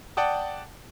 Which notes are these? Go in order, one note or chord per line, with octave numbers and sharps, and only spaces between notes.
D5 F#5 G5 A5 D#6